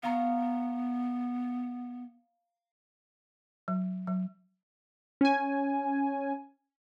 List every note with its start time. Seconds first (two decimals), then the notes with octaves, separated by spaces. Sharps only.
0.03 B3 F5 A#5 C#6
3.68 F#3
4.07 F#3
5.21 C#4 G#5